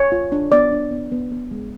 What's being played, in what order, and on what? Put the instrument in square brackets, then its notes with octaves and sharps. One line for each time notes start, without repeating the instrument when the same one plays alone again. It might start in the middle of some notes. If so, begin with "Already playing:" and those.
Already playing: [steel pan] C#5
F4
D4
B3 D5
D4
B3
B3
B3
G#3